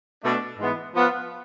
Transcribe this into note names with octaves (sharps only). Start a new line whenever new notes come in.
B2 A3 D4
G#2 E3 G#3 B3
F3 B3 F4